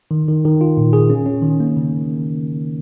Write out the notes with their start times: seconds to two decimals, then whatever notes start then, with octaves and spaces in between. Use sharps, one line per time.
0.11 D#3
0.28 D#3
0.45 D#3
0.61 F4
0.77 A#2
0.93 G#4
1.10 C#4
1.26 C#4
1.42 D#3
1.60 A#3
1.77 C#3